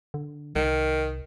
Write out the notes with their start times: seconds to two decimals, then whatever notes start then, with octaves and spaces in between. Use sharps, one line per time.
0.14 D3
0.56 C2 D#3